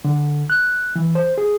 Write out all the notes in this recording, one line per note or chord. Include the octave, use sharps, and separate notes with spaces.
D3
F#6
E3
C5
G#4